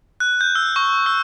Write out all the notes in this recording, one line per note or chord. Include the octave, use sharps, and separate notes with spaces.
F#6
G6
E6
C#6
E6